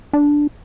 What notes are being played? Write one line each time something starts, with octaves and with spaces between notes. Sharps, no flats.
D4